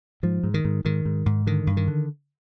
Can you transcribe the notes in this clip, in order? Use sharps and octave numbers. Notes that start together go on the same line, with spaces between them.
G#2 F3
G#2
D#3
G#2
G#2 D#3
G#2
G#2
D3 D#3
G2
D#3
D3